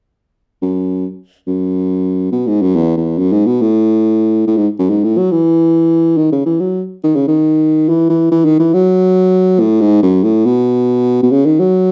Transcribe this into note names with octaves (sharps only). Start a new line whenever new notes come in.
F#2
F#2
B2
G#2
F#2
E2
E2
F#2
G#2
B2
A2
A2
G#2
F#2
G#2
A2
F#3
E3
D#3
C#3
E3
F#3
D#3
C#3
D#3
E3
E3
E3
D#3
E3
F#3
A2
G#2
F#2
A2
B2
B2
C#3
D#3
F#3